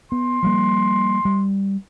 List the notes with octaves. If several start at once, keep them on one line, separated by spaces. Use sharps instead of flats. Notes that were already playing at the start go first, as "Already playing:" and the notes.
B3 C6
F3 G3 A#3
G3